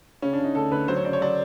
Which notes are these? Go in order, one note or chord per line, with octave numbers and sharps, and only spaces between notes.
C#3 C#4
D4
C#3
D#4
D2 A4
D2 B4
F#3 C5
C#5
C#3 D5
C#5
F#3 D5